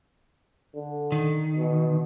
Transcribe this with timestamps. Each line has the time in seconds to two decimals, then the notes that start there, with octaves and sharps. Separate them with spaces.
0.75 D3
1.12 D#3
1.56 B2